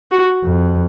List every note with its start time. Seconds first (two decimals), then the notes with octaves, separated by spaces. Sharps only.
0.11 F#4
0.44 F2